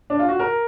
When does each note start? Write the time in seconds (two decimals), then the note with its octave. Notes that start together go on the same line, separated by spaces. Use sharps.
0.10 D4
0.19 F4
0.29 F#4
0.39 A#4